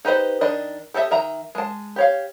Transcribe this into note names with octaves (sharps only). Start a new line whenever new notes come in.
D#4 G4 B4 C5 D#5
D#3 D4 D#5
G4 A4 D#5 E5
D#3 E5 A#5
G#3 A5
G4 C#5 F5